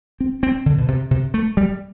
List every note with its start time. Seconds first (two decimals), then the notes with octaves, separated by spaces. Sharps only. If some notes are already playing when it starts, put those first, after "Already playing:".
0.20 C4
0.43 C4
0.66 D3
0.78 B2
0.88 C3
1.11 C3
1.34 A3
1.57 G3